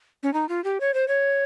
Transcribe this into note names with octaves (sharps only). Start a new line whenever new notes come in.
C#4
D#4
F4
G4
C#5
C5
C#5